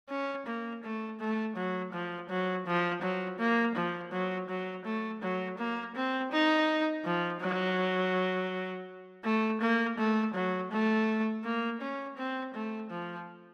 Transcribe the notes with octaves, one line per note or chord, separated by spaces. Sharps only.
C#4
A#3
A3
A3
F#3
F3
F#3
F3
F#3
A#3
F3
F#3
F#3
A3
F#3
A#3
C4
D#4
F3
F#3
A3
A#3
A3
F#3
A3
A#3
C#4
C4
A3
F3